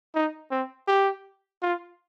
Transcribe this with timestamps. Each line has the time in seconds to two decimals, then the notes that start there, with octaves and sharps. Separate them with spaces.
0.15 D#4
0.51 C4
0.88 G4
1.62 F4